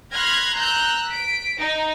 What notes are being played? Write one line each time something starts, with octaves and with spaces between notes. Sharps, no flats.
B5 C6 F6 F#6 G#6 A#6
A#5 E6 F#6 G6
B6 D7
D#4